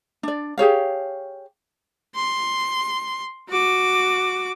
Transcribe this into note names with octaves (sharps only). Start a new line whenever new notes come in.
D4 D5
G4 G#4 C#5 F5
C6
F#4 D6